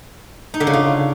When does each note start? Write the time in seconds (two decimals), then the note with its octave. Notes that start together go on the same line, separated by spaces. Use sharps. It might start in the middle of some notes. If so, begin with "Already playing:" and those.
0.54 D#4
0.60 D3
0.67 C#3
0.73 F4